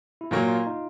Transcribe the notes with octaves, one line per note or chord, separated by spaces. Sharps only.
E4
A#2 F#3 A#3 F4
F4
D#4